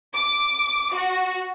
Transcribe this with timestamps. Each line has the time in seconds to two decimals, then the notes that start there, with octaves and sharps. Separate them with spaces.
0.14 D6
0.94 F#4